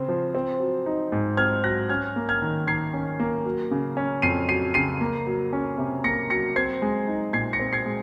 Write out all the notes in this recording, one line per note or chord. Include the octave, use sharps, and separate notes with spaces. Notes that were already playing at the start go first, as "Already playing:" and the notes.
Already playing: C#3 C4
F3
C4
F#3
D#4
G#2
C4 F6 G#6
F#3 F#6 A#6
C#4 F6 G#6
A#3
F6 G#6
D#3
D#3 G#6 C7
C#4
A#3
F#3
C#3
C#4
F2 C7 D#7
F#3 C7 D#7
C#3 C7 D#7
A#3
F#3
C#4
C3
A#3 A#6 C#7
F#3 A#6 C#7
C4 G#6 C7
G#3
D#4
A#2 G#6 C7
A#6 C#7
C4
G#6 C7
G#3